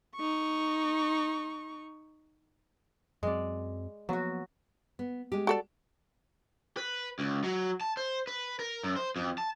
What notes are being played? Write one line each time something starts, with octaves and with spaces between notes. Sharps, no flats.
D#4 C#6
F#2 F#3 G#3 C4 D5
F3 F#3 A#3 B3 F#4
B3
G#3 G4
F#4 A4 D5
B4
C#2
F#3
A5
C5
B4
A#4
F#2
C5
F2
A5